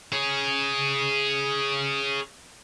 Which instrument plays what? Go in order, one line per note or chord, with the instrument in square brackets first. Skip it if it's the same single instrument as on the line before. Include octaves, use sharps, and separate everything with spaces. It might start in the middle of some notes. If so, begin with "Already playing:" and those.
[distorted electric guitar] G#4 C#5